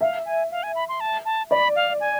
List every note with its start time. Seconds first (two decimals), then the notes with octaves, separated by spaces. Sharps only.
0.01 E5 F5
0.26 G#5
0.51 F5
0.63 G#5
0.75 B5
0.89 C6
1.00 A5
1.25 A5
1.51 D5 B5
1.76 F5
2.00 G#5